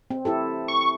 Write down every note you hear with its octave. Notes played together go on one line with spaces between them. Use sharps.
C4
E4 G4 A4
C#6